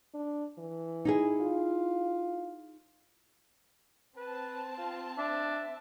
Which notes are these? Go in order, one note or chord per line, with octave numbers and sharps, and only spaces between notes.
D4
E3
D#4 E4 G#4
F4
C4 B4 A5
F4
D4 E5